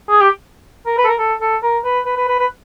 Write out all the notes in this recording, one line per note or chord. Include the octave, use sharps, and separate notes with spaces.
G#4
G4
A#4
B4
A4
A#4
A4
A4
A#4
B4
B4
B4
B4
B4